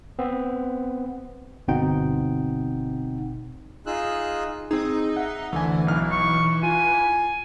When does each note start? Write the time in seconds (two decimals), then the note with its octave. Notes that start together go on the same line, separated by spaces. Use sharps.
0.19 B3 C4
1.68 G1 B2 C4 D#4 F#5 G5
3.86 D#4 F4 G#4 E6 F#6
4.71 C4 D#4 G#4
5.17 E5 F#5
5.52 D2 D3 E3 G#5
5.87 B1 D#4 F6
6.12 C#6
6.63 F4 G#5